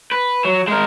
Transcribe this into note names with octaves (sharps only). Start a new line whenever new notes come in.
B4
F#3
G#3 A#4